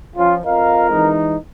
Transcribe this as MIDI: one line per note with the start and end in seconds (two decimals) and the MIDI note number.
0.16 0.39 53
0.16 0.34 61
0.16 0.34 65
0.45 1.10 41
0.45 0.86 65
0.45 1.10 70
0.45 0.86 75
0.45 0.86 77
0.90 1.37 52
0.90 1.37 56
0.90 1.37 63